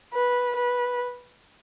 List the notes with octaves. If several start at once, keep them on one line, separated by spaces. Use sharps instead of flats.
B4
B4